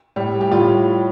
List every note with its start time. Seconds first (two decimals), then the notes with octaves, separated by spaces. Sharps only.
0.16 A2 G3
0.41 G4
0.51 A2 G3 F4